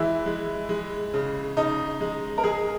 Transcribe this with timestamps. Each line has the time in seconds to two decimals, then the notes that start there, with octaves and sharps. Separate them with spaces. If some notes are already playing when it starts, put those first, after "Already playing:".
Already playing: E3 G#3 E4
0.26 G#3
0.69 G#3
1.14 C#3
1.57 C#3 D#4
2.01 G#3
2.38 A#4
2.44 G#3 G#4